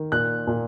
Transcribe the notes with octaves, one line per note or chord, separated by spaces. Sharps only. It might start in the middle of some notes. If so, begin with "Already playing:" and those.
Already playing: D#3
A#2 F#6
A#2